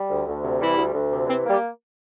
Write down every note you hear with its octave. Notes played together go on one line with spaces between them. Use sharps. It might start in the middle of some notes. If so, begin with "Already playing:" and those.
Already playing: G3
D2
D2
C3
E3 G3 E4
D2
D2
C3
E3 C4
A#3
G3 G4